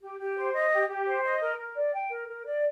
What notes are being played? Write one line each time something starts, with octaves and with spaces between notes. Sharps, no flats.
G4
G4
C5
D#5
G4
G4
C5
D#5
A#4
A#4
D5
G5
A#4
A#4
D5